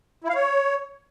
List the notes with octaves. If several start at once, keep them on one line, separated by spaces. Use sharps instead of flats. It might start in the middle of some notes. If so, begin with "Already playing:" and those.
E4
F5
C#5